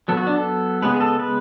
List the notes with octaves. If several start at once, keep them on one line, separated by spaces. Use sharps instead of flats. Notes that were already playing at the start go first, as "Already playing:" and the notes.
F#3 B3 A4
F#4
D4
A4
C#3 G#3 B3 B4
G#4
A4
B4